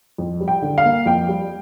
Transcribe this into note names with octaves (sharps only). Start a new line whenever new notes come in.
F2
G3
G5
D3
F5
A#3
F2 G5
G3